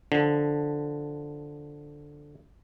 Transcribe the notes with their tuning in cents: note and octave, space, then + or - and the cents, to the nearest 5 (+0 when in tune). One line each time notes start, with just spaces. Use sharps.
D3 +0 F3 +0